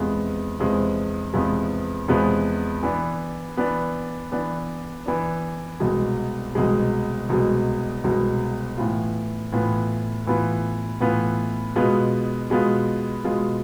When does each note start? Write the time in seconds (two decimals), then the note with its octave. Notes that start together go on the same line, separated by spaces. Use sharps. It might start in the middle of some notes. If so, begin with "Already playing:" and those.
Already playing: E2 C3 F3 G#3 B3
0.60 E2 C3 F3 G#3 B3
1.33 E2 C3 F3 G#3 B3
2.08 E2 C3 F3 G#3 B3
2.83 E3 B3 D4
3.57 E3 B3 D4
4.32 E3 B3 D4
5.06 E3 B3 D4
5.80 C2 B2 G#3
6.55 C2 B2 G#3
7.29 C2 B2 G#3
8.04 C2 B2 G#3
8.77 A2 E3 B3 F4
9.52 A2 E3 B3 F4
10.26 A2 E3 B3 F4
11.01 A2 E3 B3 F4
11.76 B2 G#3 B3 F4
12.50 B2 G#3 B3 F4
13.24 B2 G#3 B3 F4